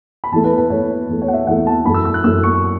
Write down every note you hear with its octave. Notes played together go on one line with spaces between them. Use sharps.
B5
E2 E3 A3 A5
B4
B4
E2 E3 A3 C#5
E2 E3 A3
C#5
F#5
E5
E2 E3 A3 F#5
A5
F#2 E3 A3 B5
E6
E6
F#6
F#2 E3 A3 E6
C#6